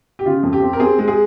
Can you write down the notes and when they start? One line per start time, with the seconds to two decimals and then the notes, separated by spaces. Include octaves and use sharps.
0.19 G4
0.26 C#3 F4
0.43 F2
0.53 G4
0.62 C4
0.73 A#4
0.80 C4 G#4
0.98 G#3
1.08 G#4